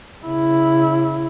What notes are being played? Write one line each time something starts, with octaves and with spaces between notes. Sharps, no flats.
C#3 E4